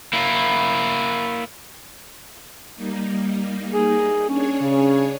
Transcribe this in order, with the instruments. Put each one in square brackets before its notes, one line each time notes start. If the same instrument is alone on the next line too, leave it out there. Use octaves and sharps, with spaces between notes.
[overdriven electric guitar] A#3 E4
[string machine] G3 A#3 D#4
[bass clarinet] G#4
[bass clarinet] C#4 [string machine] D4 G#4 C#5
[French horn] C#3